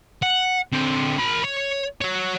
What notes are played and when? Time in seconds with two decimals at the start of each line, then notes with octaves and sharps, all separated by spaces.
0.23 F#5
0.73 D3 C4
1.19 A#4 B5
1.44 C#5
2.02 F#4 C#5